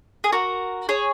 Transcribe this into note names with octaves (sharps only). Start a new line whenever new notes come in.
G#4
F#4 A#4
G#4 C#5